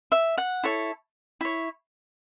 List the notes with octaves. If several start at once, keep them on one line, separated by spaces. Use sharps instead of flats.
E5
F#5
E4 A4 C#5
E4 C#5